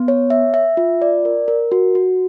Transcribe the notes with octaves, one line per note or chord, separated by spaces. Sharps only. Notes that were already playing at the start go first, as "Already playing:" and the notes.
Already playing: B3
C#5
E5
E5
F4
D5
A#4
A#4
F#4
F#4